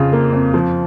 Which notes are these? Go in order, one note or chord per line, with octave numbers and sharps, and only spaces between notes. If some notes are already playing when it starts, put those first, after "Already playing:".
Already playing: F2 C#3 F4
A#3
F2
F3